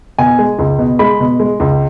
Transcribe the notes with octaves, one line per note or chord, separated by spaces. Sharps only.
B2 G#5
G#3
C#2
B2
G#3 B5
B2
G#3
C#2